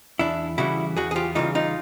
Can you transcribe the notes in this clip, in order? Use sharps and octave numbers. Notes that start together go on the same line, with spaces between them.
E2 D4 E4
C#3 E3 G3 E4 F#4
E2 F#4 G#4
G#4
F4 G4
C#3 E3 G3 D#4 F4
D#4 F4